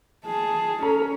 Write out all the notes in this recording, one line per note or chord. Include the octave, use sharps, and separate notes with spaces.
G#4 A5
C#4 A4 A#5